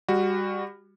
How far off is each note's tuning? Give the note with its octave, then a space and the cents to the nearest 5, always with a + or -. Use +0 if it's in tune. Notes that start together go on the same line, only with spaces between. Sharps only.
G3 +25 F#4 +0